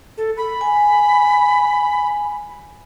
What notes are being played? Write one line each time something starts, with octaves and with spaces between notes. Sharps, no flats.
A4
B5
G#5